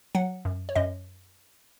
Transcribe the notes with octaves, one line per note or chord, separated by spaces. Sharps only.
F#3 F#5
F#2
C#5
F#2 D#5